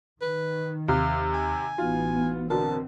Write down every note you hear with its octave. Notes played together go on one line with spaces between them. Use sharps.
D#3 B4
D#2 C3 F5 F6 F#6
G#5
A1 E3 B3 D#4 F4 F#4
B2 D3 C4 A#4 A5